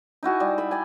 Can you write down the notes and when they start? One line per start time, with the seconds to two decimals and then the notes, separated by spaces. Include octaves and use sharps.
0.23 D#4 E4 F#4 G#5
0.40 G3
0.58 E5 B5
0.71 D5 G5 G#5